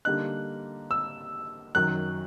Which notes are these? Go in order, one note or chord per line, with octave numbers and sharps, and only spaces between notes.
D3 G3 A#3 D#4 F#6
E6
F#2 D#3 F#3 F#6